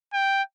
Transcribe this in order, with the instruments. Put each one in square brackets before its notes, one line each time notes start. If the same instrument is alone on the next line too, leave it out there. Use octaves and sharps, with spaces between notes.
[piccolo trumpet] G5